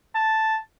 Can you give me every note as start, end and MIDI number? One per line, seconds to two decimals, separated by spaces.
0.15 0.57 81